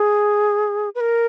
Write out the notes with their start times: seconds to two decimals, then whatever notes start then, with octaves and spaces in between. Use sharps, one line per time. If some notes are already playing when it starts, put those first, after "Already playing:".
Already playing: G#4
0.95 B4
1.00 A#4